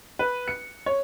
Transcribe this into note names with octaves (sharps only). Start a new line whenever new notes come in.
B4
C#7
C#5